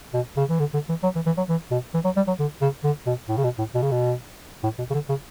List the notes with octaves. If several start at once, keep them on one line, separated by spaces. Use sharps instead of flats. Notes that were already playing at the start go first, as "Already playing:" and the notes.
B2
C#3
E3
D3
D3
E3
F#3
E3
E3
F#3
E3
B2
E3
F#3
G3
F#3
D3
C#3
D3
B2
A2
C#3
B2
A2
B2
C#3
B2
A2
B2
C#3
D3
C#3